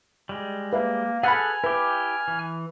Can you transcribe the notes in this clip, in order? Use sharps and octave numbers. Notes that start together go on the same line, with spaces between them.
G3 G#3
A#3 B4 E5
G#4 A4 B4 F#5 G#5 B5 F6
E4 G4 B4
E3